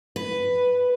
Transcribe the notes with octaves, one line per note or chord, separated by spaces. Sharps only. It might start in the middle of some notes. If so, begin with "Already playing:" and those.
B4